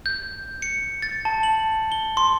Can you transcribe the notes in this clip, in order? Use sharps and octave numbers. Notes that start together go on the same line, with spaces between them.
G6
C#7
A6
A5
F#7
G7
C6